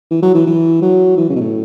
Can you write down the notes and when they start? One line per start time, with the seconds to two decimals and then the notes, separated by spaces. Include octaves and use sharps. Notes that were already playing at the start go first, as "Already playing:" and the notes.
0.11 E3
0.23 F#3
0.35 E3
0.47 E3
0.82 F#3
1.17 E3
1.29 C#3
1.36 B2
1.41 A2